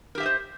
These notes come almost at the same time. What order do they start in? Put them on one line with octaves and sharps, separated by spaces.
A#4 G4 E5 D#5 C5